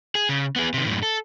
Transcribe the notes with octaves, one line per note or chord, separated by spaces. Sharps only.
G#4
C#3
B3 G#4
C3 D#3
F#2 A2
A4